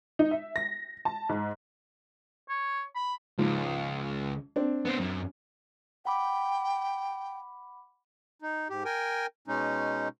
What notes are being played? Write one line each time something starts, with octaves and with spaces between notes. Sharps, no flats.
D#4
E5
A#6
A5
G#2
C#5
B5
C#2 G#2 F3
C4 D4
B3 C5
F#2
F#5 G5 B5 D6
D#4
G#2 G4
A#4 G5 G#5
B2 G#3 C#4 D#4